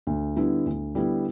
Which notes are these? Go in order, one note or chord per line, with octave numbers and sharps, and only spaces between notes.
D2
D3 G3 B3 E4
D2
D3 G3 B3 E4